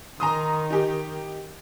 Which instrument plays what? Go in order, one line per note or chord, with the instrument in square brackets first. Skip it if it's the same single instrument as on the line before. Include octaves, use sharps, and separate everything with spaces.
[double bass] D#3 [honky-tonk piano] A#5 C6 D#6
[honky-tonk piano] D#4 G4